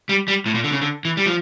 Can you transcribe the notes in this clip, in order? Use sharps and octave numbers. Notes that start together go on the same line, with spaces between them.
G3
G3
A2
A#2
D3
C#3
D3
E3
G3
F3